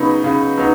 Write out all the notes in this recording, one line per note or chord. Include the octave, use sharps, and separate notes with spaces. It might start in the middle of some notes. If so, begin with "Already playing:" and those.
Already playing: C#3 F#3 B3 D#4 B5
C#3
F#3 B3 D#4